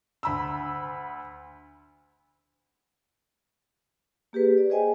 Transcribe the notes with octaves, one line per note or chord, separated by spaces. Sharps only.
D2 B5 E6
A#3 G4 G#4 B4
D5
G#4 C5 D#5 G5 G#5